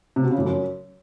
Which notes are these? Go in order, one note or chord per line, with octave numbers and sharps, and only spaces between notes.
C3
B2
C#3
F2
F#2